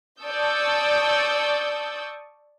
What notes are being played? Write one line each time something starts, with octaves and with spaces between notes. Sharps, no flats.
D5 A5 C#6 D#6 E6 G6